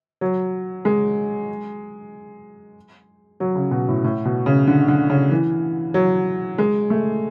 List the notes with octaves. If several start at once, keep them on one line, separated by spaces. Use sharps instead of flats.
F#3
G#3
F#3
C#3
B2
A2
A2
B2
C#3
D3
D3
C#3
E3
F#3
G#3
A3